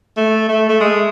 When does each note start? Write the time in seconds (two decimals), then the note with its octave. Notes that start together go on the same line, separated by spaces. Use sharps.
0.17 A3
0.49 A3
0.69 A3
0.80 G#3